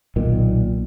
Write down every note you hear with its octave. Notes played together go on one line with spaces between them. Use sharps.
B1 A#2 D#3